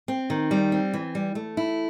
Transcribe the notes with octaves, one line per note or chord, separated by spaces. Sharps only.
C4
D#3
G3
C4
E3
G3
A3
E4